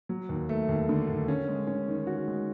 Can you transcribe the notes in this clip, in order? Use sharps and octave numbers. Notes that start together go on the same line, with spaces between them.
F#3
D#2
A3
D#2
D3
D#2
C#4
G#3
C#4
D#3
F#4
G#3